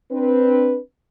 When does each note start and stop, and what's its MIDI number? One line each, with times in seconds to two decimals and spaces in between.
0.12 0.78 60
0.12 0.78 62
0.12 0.78 71